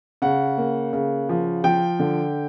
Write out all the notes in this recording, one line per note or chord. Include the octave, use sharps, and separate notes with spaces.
C#3 F#5
A#3
C#3
F3
F3 G5
D3